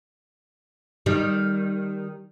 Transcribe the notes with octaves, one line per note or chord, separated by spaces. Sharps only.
D#3 G3